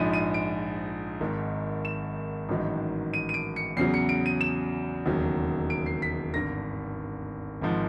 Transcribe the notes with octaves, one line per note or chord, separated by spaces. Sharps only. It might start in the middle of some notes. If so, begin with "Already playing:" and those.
Already playing: A#1 G#2 F3 D#7
D#7
D7
G#1 G#2 D#3
E7
A1 G#2 D#3 F#3
D#7
D#7
D7
C#7
E2 C#3 F#3 C7
C#7
D7
D#7
E7
E1 D#2 C#3 F#3
D7
C7
B6
G#1 G2 D3 A#6
G#1 G#2 F3